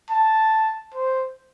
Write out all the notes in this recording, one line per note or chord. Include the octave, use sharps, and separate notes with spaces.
A5
C5